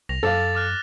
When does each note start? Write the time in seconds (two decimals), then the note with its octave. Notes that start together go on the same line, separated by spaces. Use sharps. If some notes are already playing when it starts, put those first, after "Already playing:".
0.09 C2 A#6 F7
0.23 F#2 A4 F5 D6 A6
0.55 D6 F6 F#6